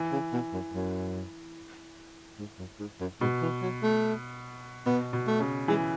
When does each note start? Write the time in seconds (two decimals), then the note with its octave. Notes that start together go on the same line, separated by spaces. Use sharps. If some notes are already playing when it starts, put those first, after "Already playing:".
Already playing: E3
0.12 C#3
0.33 B2
0.53 F#2
0.74 F#2
2.39 G#2
2.59 F#2
2.79 G#2
3.00 F#2
3.21 G#2 B2
3.42 E3
3.62 F#3
3.83 A3
4.86 B2 B3
5.13 B2
5.27 A3
5.40 C#3
5.68 E3 G#3